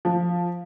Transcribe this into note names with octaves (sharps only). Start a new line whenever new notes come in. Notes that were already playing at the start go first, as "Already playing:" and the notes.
F3